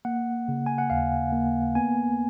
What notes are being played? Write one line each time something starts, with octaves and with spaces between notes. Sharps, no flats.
A#3 F#5
C#3
G#5
F#5
D#2 F5
A#3
B3 G#5